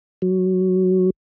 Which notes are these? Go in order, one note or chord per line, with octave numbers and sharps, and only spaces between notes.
F#3